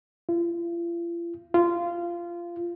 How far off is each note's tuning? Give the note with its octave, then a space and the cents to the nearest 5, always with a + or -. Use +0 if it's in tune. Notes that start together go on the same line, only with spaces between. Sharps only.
F4 -45
F4 -20